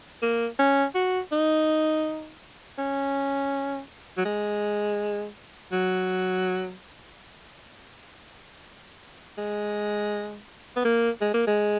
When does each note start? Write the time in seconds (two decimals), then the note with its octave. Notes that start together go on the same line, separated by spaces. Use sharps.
0.22 A#3
0.59 C#4
0.95 F#4
1.32 D#4
2.78 C#4
4.17 F#3
4.25 G#3
5.72 F#3
9.38 G#3
10.76 B3
10.85 A#3
11.21 G#3
11.34 A#3
11.47 G#3